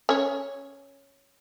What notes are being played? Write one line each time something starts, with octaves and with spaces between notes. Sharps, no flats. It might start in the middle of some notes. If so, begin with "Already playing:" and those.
C#4 C#5